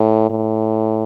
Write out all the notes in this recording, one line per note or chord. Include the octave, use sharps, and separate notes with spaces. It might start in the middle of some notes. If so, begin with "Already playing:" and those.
Already playing: A2
A2